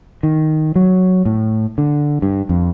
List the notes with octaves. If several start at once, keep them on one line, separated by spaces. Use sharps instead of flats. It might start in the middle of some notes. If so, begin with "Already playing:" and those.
D#3
F#3
A2
D3
G2
F2